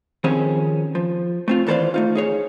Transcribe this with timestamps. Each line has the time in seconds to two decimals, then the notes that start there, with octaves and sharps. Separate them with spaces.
0.24 D#3 F3 C4 C#4 G4 G#4
0.95 F3
1.48 A3 C4 F4
1.67 D#2 E3 A4 C5 D5 F5
1.94 A3 D#4 F4
2.15 D#4 G#4 C#5